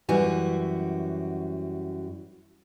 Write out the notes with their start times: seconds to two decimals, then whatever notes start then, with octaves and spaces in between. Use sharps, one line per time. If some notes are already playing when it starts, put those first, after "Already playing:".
0.09 F#2 E3 G3 F#4